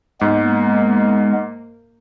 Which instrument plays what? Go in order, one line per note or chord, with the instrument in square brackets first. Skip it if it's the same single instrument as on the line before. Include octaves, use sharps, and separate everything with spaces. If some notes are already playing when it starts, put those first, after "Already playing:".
[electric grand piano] G#2 [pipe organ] G#3 B3 [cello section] A#3